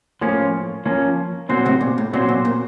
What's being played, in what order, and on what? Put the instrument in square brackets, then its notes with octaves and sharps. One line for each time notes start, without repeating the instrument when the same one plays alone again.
[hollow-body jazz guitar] A2 [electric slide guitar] F3 A#3 C#4
[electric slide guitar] F3 A#3 C#4
[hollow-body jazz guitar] A#2 [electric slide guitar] F#3 C4 F#4 C5
[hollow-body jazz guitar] A2 C3
A#2
A2
[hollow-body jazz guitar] A#2 [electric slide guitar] F#3 C4 F#4 C5
[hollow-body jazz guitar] A#2
A#2